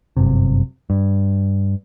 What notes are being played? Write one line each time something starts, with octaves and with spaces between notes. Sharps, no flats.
G1 F#2 C3
G2